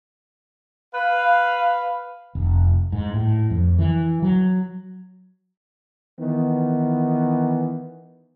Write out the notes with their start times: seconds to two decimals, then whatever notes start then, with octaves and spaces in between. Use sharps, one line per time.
0.95 B4 F5
2.35 F1
2.92 G#2
3.14 A2
3.51 F2
3.79 E3
4.23 F#3
6.19 D#3 E3 B3